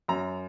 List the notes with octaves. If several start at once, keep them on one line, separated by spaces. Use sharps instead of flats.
F#2 A#5